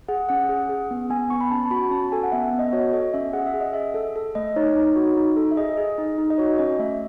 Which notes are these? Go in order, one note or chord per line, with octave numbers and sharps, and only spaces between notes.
G#4 F#5
C#4 F#5
G#4
G#4
B3
B3 G#5
B3 C#6
B5
C#4 A5
A5
F#4 B5
C#4 A5
A4 G#5
F#5
B3 E5
E5
B3
D#5
F#4 C#5
A4 D#5
C#4 E5
G#4 F#5
E5
G#4
D#5
G#4 E5
A4
A4
A3 D#5
D#4 C#5
D#4
F#4
D#4
A4
E5
G#4 D#5
G#4
D#4
D#4
D#5
F#4 C#5
C#4 D#5
A3 E5